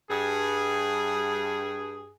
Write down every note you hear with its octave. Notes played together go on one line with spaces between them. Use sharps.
G2 G#4